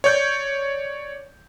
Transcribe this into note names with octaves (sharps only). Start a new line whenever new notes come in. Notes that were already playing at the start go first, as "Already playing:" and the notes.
C#5 D5 G6